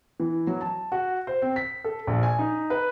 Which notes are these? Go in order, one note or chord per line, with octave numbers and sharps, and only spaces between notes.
E3
F#3
A5
F#4
C5
C4
B6
A4
A#1
G#5
D#4
B4